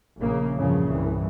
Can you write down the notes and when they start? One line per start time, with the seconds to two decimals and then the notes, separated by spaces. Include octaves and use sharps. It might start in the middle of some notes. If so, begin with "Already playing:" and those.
0.18 A#1 C#3 A#3
0.57 E2 G2 A#2 C#3 F3
0.90 C2 G2 E3